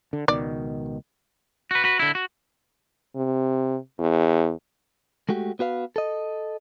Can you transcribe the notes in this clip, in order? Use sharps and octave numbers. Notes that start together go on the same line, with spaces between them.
D3
C#2 B2 D#3 D5
F#4 B4
F#4 B4
D3 E4
F#4
C3
E2
G#3 A3 F#4 G4
B3 F#4 B4 F5
A4 D#5